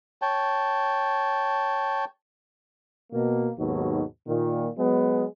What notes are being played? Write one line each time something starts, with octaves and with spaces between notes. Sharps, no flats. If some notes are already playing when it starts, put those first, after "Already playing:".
C#5 G5 A5
B2 A#3
D#2 G#2 B2 F#3
A#2 D#3
F#3 G#3 B3